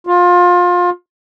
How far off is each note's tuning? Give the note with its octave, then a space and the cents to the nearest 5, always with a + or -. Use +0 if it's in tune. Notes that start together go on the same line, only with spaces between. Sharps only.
F4 +25